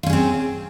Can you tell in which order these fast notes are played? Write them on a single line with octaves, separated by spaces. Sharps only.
F4 C#4 G#4 C4